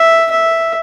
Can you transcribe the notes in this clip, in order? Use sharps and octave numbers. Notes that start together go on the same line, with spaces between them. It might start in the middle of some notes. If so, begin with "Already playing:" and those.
Already playing: E5
E5